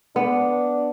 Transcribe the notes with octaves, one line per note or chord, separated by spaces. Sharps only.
B3 D4